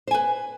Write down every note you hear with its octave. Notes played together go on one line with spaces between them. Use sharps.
B4 C5 G#5